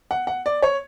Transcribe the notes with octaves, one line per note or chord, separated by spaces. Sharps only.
F#5
F#5
D5
C#5